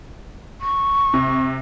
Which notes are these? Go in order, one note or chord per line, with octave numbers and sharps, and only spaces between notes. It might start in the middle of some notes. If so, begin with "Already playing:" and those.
C#6
C3